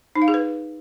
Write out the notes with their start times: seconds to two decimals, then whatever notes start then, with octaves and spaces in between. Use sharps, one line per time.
0.16 D#4
0.22 F5
0.28 G#4
0.34 B4